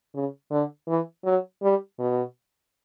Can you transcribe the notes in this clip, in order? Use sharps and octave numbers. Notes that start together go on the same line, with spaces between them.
C#3
D3
E3
F#3
G3
B2